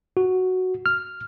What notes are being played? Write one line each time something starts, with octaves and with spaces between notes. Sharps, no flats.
F#4
F6